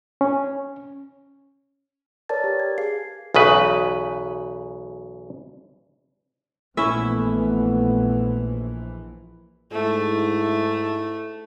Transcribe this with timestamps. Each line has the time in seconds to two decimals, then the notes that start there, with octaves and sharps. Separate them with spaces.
0.21 C#4
2.29 A#4 B4 C#5 D5 A5 A6
2.44 G4
2.59 G#6
2.78 G#4 F5 C7
3.34 B1 E2 C#3 B4
6.77 A#1 E3 A3 B3 C#4 E4 B4 E5
9.72 G#2 A3 E4